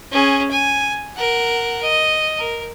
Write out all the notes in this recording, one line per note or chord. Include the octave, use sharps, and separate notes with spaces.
C#4 G#4
G#5
A#4 F#5
D#5
A#4